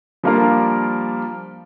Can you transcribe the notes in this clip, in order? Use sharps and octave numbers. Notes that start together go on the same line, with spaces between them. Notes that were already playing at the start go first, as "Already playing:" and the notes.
F3 G3 A#3 D4 F4 A#4